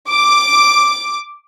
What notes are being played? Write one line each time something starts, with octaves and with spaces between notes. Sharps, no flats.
D6